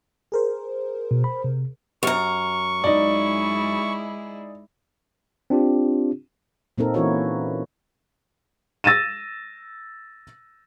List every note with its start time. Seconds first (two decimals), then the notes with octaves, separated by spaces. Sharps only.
0.32 G#4 A#4 C5
1.11 B2
1.24 B5
1.44 C3
2.03 F#2 A#5 C#6
2.84 G#3 D#4 E4 G#4 D5
5.50 C4 D4 F4 G4
6.78 A#2 A#3 C4 D#4 A4 A#4
6.94 E3 C#4 E4 F#4 A#4 C#5
8.84 E6 A6 A#6 D#7 E7